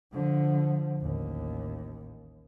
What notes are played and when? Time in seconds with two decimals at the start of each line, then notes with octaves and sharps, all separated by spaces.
0.13 D3 F3
0.98 A1 D#2